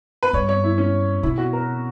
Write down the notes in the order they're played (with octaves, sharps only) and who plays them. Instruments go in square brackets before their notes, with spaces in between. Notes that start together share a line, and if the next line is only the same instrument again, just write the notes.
[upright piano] B4
[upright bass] G2 [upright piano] C#5
[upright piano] C#5
E4
C#4
[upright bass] B2 [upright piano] E4
[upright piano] F#4
A#4